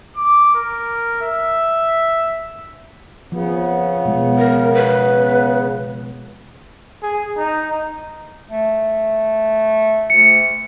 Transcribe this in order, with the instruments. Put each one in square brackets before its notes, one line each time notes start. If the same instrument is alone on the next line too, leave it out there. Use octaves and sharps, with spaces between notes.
[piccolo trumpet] D6
A#4
E5
[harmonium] C#3 B3 [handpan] F3
[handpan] B2 G#3
[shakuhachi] A#4
B4
[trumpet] G#4
D#4
[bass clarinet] A3
[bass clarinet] D2 [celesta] C#7